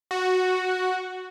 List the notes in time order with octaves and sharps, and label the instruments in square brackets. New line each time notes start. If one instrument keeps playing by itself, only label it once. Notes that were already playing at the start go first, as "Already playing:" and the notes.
[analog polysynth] F#4